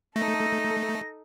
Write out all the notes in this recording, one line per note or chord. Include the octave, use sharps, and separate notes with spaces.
A3 D#4 A4 A#6